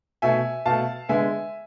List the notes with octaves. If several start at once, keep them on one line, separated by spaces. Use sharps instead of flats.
B2 A3 E5 G#5
B2 A3 F5 A5
D3 G#3 B3 E5 G#5